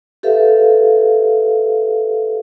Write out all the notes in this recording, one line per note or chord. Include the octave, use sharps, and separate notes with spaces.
G4 A4 B4 E5 F5